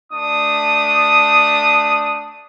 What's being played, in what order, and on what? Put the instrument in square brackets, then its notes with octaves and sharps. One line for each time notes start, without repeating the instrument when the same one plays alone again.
[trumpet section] A3 D4 D#6